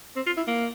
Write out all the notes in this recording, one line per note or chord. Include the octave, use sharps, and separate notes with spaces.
C4
F4
E4
A#3